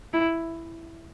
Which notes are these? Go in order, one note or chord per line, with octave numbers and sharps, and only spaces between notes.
E4